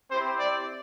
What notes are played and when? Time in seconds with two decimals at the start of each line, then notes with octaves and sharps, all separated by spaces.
0.11 C4 E4 G4 C5
0.39 D5